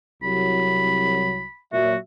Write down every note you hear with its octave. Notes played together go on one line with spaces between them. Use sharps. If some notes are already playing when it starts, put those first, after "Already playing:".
C2 F#3 B5
A#2 F#3 F#4 E5